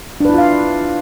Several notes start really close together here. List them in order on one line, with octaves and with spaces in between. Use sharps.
D4 B4 E4 F4 F5